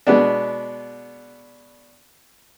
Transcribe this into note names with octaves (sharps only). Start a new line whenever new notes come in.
B2 G#3 B3 D4